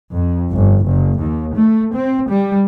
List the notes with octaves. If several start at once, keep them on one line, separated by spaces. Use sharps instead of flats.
F2
G1
F#1
D#2
A3
C4
G3